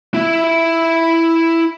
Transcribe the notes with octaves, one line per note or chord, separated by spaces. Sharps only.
E4 E5